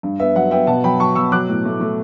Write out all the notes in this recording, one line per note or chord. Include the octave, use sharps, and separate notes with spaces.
G2
B3 E5
F#3 F#5
B3 E5 G5
B2 F#5 A5
F#3 G5 B5
F#3 A5 C#6
B2 C#6 E6
F#3 D6 F#6
A2
A3
A3